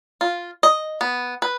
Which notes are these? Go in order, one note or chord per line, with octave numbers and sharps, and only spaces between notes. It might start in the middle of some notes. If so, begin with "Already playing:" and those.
F4
D#5
B3
B4